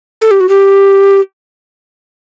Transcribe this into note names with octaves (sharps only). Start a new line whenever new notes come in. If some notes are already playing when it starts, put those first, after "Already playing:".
A4
G4
F#4
G4